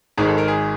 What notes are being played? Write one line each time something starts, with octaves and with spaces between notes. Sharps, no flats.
G#1 G#2 D#3 G#3 G#4
A4
A#4
G#4